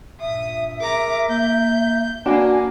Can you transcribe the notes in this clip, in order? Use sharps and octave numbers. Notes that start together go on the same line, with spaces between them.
G2 A#2 E5 D#6
G#4 A#4 A#5 D6
A#3 G6
A#3 D4 F#4 B4 G#5